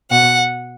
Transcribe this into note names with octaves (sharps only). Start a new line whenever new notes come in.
B2 F#5